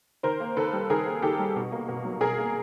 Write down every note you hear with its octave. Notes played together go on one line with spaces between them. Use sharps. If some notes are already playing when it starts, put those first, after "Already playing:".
D#3 A#4 C5
A#3
D#3 A4 B4
G3
D#3 G#4 A#4
A#3
D#3 G4 A4
G3
B2
A#3
B2
F#3
B2 G#4 A#4
A#3